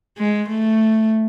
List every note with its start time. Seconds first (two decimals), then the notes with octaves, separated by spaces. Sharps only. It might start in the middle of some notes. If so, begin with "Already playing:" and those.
0.18 G#3
0.50 A3